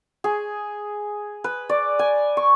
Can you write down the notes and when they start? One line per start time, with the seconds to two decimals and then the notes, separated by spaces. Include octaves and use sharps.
0.24 G#4
1.44 B4
1.69 D5
1.99 G#5
2.37 C#6